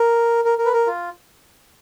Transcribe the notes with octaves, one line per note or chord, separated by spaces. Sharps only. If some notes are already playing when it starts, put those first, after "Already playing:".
Already playing: A#4
A#4
A#4
B4
A#4
F4